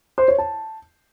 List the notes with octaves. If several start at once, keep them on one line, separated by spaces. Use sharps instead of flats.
C5
C#5
A5